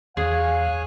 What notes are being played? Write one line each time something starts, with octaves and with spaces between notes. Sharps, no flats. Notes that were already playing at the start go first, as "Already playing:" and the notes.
E2 G#4 C#5 F5 G#5 F#6